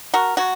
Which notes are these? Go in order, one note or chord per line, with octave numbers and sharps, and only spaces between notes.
F#4 A#4
F#3 F#4